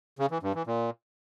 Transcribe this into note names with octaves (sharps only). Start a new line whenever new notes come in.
C#3
E3
G2
E3
A#2